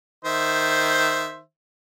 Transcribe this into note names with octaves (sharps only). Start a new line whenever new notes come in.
D#3 C5 E5